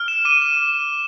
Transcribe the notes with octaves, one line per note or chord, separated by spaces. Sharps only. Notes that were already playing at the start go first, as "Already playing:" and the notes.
Already playing: F6
E7
D6 D#7
E7